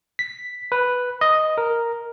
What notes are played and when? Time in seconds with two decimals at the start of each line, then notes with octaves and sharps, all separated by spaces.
0.19 B6
0.72 B4
1.21 D#5
1.58 A#4